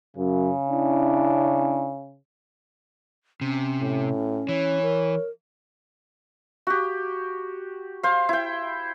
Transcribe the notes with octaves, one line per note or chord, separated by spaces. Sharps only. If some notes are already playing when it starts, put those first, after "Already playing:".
F#2 C#3
C#4 D4 E4
C3 C#4
A2
E3 C#5
A#4
F#4 G4
C5 F5
E4 G5